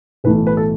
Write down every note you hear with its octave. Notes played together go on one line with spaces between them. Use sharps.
B1 A2 E3 A3 B4
B4
A4